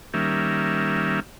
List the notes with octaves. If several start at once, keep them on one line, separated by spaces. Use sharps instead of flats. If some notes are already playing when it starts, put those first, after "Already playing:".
D#3 G3 A#3 C#4 E5